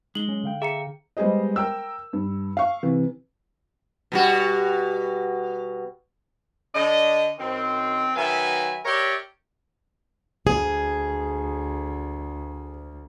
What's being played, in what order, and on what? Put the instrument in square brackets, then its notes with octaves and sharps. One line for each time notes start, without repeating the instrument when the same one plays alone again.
[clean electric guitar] G#3 [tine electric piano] D#4 [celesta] F#7 G7
[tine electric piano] F#3 C#4
D3 F5 G5
[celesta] G#4 A#5 C#7 [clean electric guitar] E5
[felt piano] G3 G#3 B3 G#4 C5 D#5
A#4 G5 E6
G2
F5 C#6
C3 E3
[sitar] B2 G3 F#4
[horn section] D3 D4 D#5
F#2 D#3 C4
D#3 F#3 B4 E5 G#5
G4 A#4 C#5 D5 E5
[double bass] D2 [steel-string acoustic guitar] G#4